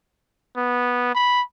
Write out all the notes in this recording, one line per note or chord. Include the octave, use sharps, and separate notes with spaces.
B3
B5